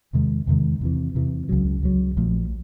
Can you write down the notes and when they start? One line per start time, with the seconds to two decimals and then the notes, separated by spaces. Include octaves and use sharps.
0.13 E2 C3 D#3 G#3
0.47 E2 C3 D#3 G#3
0.81 E2 C3 E3
1.15 E2 C3 E3
1.49 C#2 C#3 F#3
1.83 C#2 C#3 F#3
2.17 A#1 A#2 F3 A3